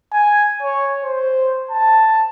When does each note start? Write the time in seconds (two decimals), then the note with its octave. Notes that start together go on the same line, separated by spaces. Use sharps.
0.13 G#5
0.63 C#5
1.04 C5
1.71 A5